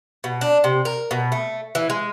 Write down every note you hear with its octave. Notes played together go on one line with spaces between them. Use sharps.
B2
D4
C3
A#4
B2
A3
E3
G#3